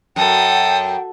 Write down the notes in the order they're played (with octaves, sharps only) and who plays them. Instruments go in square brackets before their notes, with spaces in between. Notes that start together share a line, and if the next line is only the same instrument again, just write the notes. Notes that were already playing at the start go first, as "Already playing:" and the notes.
[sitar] F#2 [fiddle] A4 D#6 [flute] G5